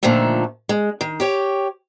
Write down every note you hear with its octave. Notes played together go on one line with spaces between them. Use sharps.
A#2 D3 D#3 F3 A3
G#3
D#3
G4 C#5 G5